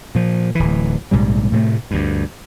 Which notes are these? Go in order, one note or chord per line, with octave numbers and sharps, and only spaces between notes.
A#2 F3
D1 E3
A#1 G#2 C3 G3
A2 C3 F3 A3
D2 G2